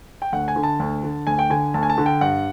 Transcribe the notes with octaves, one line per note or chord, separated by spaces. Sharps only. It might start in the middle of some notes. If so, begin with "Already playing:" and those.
G5
D2 F#5
G#5
D3
A5
D2
D3
D2 G#5
G5
D3 G#5
D2 A5
G#5
A5
D3
G5
G2 F#5